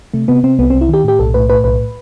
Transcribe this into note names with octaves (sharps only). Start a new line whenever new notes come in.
C3 A3
C3 B3
C3 C4
C2 B3
C4
C2
E4
D#3 G4
A2 G4
B1 A4
A2 B4
A2 B4
B1 B4